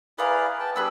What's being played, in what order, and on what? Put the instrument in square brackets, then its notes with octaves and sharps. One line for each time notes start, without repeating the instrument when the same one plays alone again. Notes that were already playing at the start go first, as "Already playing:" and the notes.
[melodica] E4 G#4 D5 [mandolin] B4 F5 A#5
[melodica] G5 A5
[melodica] G3 B3 D4 [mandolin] G#4 B4 E6